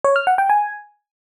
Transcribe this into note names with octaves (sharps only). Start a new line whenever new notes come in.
C#5
F6
F#5
G5
G#5